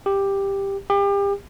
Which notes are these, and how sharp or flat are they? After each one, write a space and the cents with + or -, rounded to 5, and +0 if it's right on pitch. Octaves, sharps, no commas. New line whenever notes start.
G4 +10
G4 +35